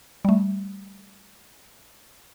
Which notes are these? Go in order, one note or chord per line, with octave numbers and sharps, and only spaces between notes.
G3 A3